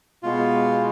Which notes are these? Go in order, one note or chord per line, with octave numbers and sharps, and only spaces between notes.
B2 G#3 B3 F4